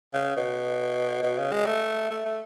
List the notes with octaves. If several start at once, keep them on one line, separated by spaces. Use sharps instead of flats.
C#3
B2
B2
C#3
G#3
A3
A3
A3